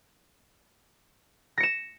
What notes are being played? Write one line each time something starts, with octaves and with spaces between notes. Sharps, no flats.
A#6 C#7 E7